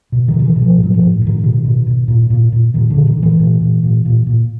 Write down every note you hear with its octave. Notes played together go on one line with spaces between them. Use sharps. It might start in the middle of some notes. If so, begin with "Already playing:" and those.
B2
D#3
B2
D#3
E3
B2
F3
A2
F#3
F3
A2
A2
D#3
B2 D#3
B2
B2
A#2
A#2
A#2
A#2 D#3
D3
A#2
D#3
A#2 E3
A#2
A#2
A#2
A#2
A#2